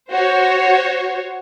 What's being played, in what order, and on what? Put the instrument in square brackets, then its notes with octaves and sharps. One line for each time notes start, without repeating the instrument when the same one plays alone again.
[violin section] F#4 C5 C#5